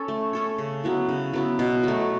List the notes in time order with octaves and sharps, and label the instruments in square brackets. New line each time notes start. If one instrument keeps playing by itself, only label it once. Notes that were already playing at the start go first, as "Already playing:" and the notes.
Already playing: [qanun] C#4 A4 C#5
A3
C#4 A4 C#5
C#3
F#3 B3 E4
C#3
F#3 B3 E4
B2
F#3 A3